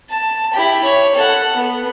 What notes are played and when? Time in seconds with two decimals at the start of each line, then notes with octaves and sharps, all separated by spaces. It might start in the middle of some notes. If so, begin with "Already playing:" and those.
0.10 A5
0.54 E4 G4
0.84 C#5
1.15 A4 F#5
1.56 B3